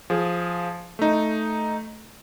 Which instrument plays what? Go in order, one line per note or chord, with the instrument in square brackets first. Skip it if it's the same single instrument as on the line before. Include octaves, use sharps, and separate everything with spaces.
[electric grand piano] F3 G#4
A3 D#4